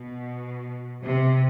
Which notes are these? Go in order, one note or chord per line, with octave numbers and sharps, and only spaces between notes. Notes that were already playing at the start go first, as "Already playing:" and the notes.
Already playing: B2
C3